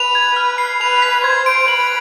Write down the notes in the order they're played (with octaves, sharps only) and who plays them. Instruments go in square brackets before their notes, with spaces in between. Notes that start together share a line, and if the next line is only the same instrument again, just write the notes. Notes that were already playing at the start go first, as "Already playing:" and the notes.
Already playing: [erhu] B4 [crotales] F7
[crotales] G#6
F6
C7
[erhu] B4 [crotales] F7
[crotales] B6
[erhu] C5 [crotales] G#6
[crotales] D7
[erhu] B4 [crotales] F#7